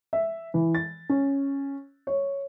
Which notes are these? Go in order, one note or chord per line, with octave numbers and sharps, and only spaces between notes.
E5
E3
A6
C#4
C#5